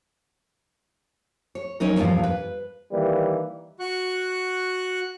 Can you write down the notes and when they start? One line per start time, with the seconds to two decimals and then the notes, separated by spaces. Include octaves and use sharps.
1.55 C#5
1.80 F#3 C#4 D#4 A#4
1.96 E2 G2 A#2 F3 F5
2.23 B4
2.91 D#3 E3 G3 A#3
3.80 F#4 C#6 F#6